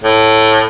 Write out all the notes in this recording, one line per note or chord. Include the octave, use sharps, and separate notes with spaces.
A2